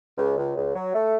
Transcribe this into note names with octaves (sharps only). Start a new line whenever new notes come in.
C#2
C#2
C#2
F#3
A3